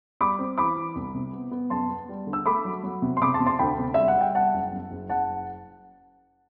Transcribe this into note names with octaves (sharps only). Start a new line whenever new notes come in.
G3 B5 D6
C4
E3 B5 D6
E3
C2
C3
B3
B3
F#2 A5 C6
B3
G3
D3
E6
A3 B5 D6
F#3
F#3
C3
C6
C3 B5 D6
A5 C6
C3
A5 C6
D2 G5 B5
C3
G3 E5
F#5
G3 G5
G3 F#5 A5
F#1
F#2
F#1
F#1 F#5 A5